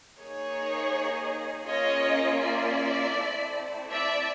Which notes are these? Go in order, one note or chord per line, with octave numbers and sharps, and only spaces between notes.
A#3 D#4 G#4 C#5
A#3 C#4 F4 G#4 C#5 D#5
D5 E5
A3 C4 E4
D5 E5